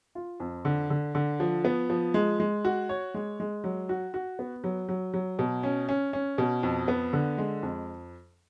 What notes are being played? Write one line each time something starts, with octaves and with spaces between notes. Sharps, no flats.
F4
F2
D3
D3
D3
F3
B3
F3
G#3
G#3
F#4
C#5
G#3
G#3
F#3
F#4
F#4
B3
F#3
F#3
F#3
B2
C#4
C#4
C#4
B2
F2
B3
D3
G#3
F2